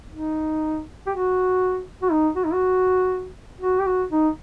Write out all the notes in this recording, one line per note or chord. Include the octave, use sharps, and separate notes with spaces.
D#4
G4
F#4
F#4
D#4
F#4
D#4
F#4
F#4
G4
F#4
D#4